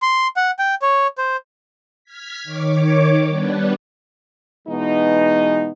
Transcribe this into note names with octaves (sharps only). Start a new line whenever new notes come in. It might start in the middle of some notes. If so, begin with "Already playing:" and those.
C6
F#5
G5
C#5
C5
F6 G#6 B6
D#3 C#5 D6
G3 B3 D4 B4
B2 E3 G#3 B3 D#4